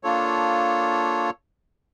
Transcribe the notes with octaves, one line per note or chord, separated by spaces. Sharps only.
A#3 D4 F4 A4 C#5